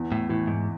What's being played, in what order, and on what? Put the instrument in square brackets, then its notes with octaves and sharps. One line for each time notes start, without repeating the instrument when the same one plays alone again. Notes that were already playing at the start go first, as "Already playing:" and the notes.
Already playing: [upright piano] E2
[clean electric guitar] A2
[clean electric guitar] A2 [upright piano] E3
[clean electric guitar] G#2